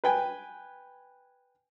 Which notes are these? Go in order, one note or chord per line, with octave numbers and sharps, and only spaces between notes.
B4 G5 G#5